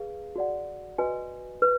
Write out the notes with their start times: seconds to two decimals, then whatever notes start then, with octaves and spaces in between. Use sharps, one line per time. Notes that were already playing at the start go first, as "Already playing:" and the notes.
Already playing: G#4 B4 F5
0.36 F#4 D5 F#5
0.98 F#4 B4 D#5 G#5
1.62 B4